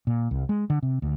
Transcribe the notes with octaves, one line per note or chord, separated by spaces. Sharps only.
A#2
C2
G#3
D3
C3
D2